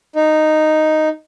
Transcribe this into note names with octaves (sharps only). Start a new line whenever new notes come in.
D#4